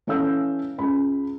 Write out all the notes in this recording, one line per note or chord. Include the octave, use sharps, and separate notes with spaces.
E3 C#4 A4 F5 E6 G6
C#2 B5